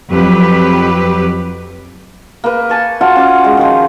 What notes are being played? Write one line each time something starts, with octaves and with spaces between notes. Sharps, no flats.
F2 F#3 G4 B4
A#3 B4
G#5 A5 C#6
F4 F#4 F#5 A5
C#4 D6
G#3
D#3 F3